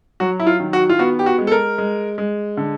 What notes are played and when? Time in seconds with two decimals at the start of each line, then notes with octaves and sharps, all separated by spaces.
0.20 F#3 F#4
0.40 E4
0.47 F4
0.60 D#3
0.73 F#4
0.89 F4
0.99 B3 F#4
1.19 G4
1.26 F#4
1.38 G#3
1.47 A4
1.52 A#4
1.78 G#3
2.18 G#3
2.57 D3